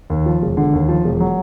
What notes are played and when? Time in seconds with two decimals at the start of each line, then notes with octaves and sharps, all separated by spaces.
0.10 D#2
0.26 F3
0.42 E1
0.57 D3
0.73 D#2
0.89 F3
1.04 E1
1.20 F#3